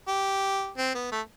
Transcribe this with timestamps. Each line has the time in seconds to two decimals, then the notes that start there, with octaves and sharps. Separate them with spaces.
0.08 G4
0.78 C4
0.95 B3
1.12 A3